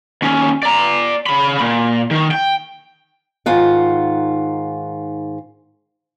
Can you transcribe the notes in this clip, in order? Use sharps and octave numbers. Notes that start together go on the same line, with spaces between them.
D#2 C#4
D5 A#5
C#3 B5
A#2
D#3
G5
G#2 D#3 F4 F#5